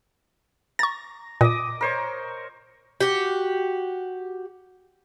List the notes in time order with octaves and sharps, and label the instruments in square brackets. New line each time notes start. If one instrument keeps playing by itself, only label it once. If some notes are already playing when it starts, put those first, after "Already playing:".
[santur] A#5 [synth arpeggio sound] C#6 A6
[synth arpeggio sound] A#2 [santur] D#5 D6 D#6
[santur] A#4 C5 C#5
[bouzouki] F#4 G4